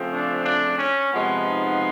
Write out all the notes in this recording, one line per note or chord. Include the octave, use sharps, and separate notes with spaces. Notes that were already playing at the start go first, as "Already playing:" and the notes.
Already playing: C#3 F3 A3 C4
D4
D4
C#4
C3 F3 G#3 B3
D#4